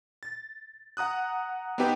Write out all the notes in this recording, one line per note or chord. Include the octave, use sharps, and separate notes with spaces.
A6
F#5 A#5 D#6 F#6
B3 C4 D#4 G4 B4 G5